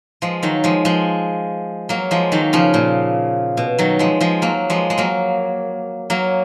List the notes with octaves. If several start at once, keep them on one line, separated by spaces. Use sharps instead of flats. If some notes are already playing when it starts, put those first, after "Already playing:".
F3 G#3
D#3 F#3
F3 G#3
F3 G#3
F#3 A#3
F3 G#3
D#3 F#3
C#3 F3
A#2
B2
D#3 F#3
F3 G#3
F3 G#3
F#3 A#3
F3 G#3
G#3
F#3 A#3
F#3 A#3